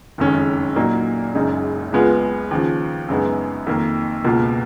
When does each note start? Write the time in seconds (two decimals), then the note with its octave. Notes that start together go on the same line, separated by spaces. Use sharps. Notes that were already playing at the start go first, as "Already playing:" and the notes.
0.18 F#1 F2 D#3 G#3 C#4
0.76 A#2 F#3 A#3 D#4
1.35 F#1 F#2 C#3 G#3 D#4
1.92 C#2 C#3 G#3 B3 F4
2.51 D#2 C#3 F3
3.09 F#2 C#3 G#3 B3 D#4
3.67 F2 D#3 A#3
4.24 C#2 B2 A#3 F4